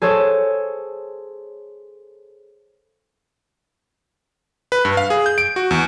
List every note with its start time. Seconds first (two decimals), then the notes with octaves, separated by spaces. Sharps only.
0.02 G#4 A4 C5 C#5
4.72 B4
4.85 G2
4.97 F5
5.10 G#4
5.26 G6
5.38 D7
5.56 F#4
5.71 E2